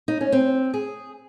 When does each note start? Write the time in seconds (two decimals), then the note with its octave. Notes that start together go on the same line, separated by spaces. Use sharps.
0.08 D#4
0.21 C#4
0.32 C4
0.74 G#4